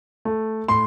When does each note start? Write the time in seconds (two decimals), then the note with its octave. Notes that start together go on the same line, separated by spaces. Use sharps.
0.25 A3
0.68 A2 C6